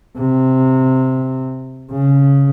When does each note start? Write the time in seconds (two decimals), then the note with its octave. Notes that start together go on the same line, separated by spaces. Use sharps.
0.18 C3
1.92 C#3